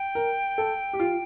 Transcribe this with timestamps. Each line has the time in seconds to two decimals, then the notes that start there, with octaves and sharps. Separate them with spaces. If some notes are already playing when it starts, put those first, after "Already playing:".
Already playing: G5
0.15 A#4
0.58 A4
0.93 G4
1.00 F4